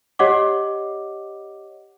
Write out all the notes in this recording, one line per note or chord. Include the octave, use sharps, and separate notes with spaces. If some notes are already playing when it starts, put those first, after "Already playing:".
G4 C#5 D#5 F#5 D6